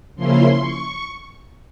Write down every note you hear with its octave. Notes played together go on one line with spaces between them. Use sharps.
C#3 F3 A#3 C#4 E4 C6
C#6